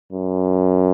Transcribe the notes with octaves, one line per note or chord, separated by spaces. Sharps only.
F#2